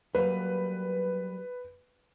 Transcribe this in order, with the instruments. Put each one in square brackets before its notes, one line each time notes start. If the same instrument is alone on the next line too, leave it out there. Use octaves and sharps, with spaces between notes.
[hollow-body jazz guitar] F#3 G3 A#3 [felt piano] B4